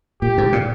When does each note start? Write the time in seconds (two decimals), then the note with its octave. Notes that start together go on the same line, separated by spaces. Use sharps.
0.21 A#2 G4
0.38 G#2
0.53 A#2